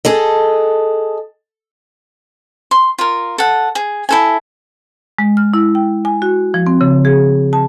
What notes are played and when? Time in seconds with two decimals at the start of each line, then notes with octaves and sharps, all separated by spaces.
0.05 G#4 A4 D#5
2.71 C6
2.99 F4 A#4
3.38 A4 F#5
3.75 G#4
4.09 E4 A4 G#5
5.19 G#3
5.37 F6
5.54 E4
5.75 G5
6.05 G#5
6.22 F#4
6.54 F3
6.67 C4
6.81 C#3
7.05 G#4
7.53 A5